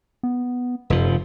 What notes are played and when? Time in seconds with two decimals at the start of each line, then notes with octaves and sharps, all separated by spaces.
0.23 B3
0.90 F1 F#2 F3